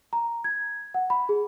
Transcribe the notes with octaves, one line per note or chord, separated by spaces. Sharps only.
A#5
G#6
F#5
B5
G#4